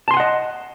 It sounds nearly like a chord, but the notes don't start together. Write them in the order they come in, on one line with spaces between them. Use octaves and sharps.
A5 C6 G#5 F#5 D#5